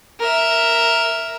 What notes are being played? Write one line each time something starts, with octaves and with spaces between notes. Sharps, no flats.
A#4 E5